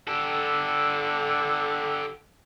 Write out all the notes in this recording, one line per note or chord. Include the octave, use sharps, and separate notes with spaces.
D3 G4 A4